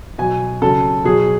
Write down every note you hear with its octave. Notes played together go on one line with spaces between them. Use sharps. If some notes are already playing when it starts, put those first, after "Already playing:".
B2 F#3 G#5
C#3 F#3 A4
B2 F#3 G#4